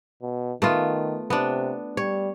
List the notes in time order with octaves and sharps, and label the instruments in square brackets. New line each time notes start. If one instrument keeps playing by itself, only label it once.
[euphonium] B2
[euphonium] D#3 [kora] A3 B3 F4
[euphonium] C3 [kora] B3 D4
[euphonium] G3 [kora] C#5